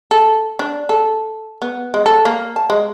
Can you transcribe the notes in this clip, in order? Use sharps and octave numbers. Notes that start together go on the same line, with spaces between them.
A4
D4
A4
B3
G#3
A4
A#3
A5
G#3